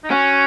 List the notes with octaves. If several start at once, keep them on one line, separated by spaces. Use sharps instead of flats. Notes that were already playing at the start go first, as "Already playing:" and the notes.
D#4
C#4 F#4